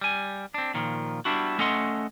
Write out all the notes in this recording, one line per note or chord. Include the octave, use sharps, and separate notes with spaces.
G3 G#5
C4 D4
A#2 D#3 F3
G3 B3 D4 E4 F#4
A3 C#4 A4 D#5 F#5 C6